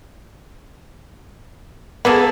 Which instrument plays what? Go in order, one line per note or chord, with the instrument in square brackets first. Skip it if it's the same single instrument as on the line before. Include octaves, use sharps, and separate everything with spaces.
[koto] A#3 G#4 A4 [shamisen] B3